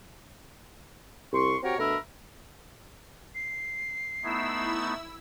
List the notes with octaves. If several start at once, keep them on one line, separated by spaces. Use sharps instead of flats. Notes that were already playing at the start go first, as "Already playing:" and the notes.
C2 C6 C#6
C4 F#4 G4 A#4 C#5 G5
B2 A3 D4 A#4 E5 B5
C7
A3 B3 D#4 E4 E6